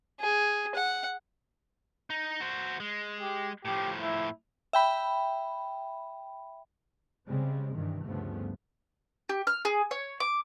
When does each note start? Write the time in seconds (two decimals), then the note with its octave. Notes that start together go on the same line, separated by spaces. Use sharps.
0.21 G#4
0.75 F#5
2.10 D#4
2.40 F#4 C5
2.80 G#3
3.21 G4
3.65 A2 F3 G4
4.02 E4
4.73 E5 G5 B5
7.27 C#3 G3 G#3 C4
7.74 G2 C3 D#3 E3
8.05 D2 G2 C#3 F3 A3 B3
9.29 G4
9.47 F6
9.65 G#4
9.91 C#5
10.20 D6